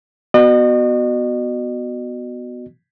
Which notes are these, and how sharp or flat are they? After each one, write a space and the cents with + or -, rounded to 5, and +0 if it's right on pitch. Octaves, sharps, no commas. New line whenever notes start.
B3 +0 F#4 +0 D#5 -40